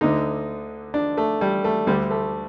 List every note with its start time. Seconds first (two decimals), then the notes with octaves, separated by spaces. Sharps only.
0.01 D2 D3 D#4
0.94 D4
1.17 A3
1.41 G3
1.64 A3
1.87 D2 D3 G3
2.10 A3